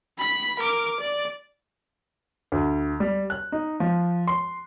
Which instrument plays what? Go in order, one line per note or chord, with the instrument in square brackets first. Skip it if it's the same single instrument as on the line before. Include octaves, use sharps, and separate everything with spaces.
[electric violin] B5 B6
A#4 D6
D5
[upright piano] D2
G3
F#6
D#4
F3
C6